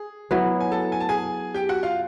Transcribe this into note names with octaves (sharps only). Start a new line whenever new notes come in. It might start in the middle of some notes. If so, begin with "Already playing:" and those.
Already playing: G#4
F#3 B3 E4
G#5
A4 A5
G#5
A5
G#4 G#5
G4 G5
F#4 F#5
F4 F5